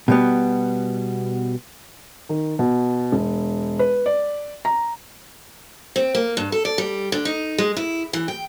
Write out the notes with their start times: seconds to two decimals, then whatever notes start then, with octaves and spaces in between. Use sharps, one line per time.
0.08 B2 G3 B3
2.29 D#3
2.59 B2
3.12 E1
3.79 B4
4.06 D5
4.65 A#5
5.96 C4
6.15 A#3
6.37 G2
6.52 A4
6.65 D5
6.78 G3
7.12 D3
7.25 D#4
7.58 G#3
7.77 E4
8.13 E3
8.28 G5